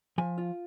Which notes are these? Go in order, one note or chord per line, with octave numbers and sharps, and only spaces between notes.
F3 G#5
F4